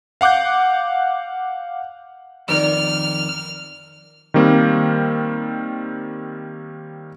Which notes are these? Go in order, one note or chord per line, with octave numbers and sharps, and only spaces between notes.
F5 F#5 D6 F#6 G6
F2 D#3 A#4 D5 F6
D#3 G3 A#3 C4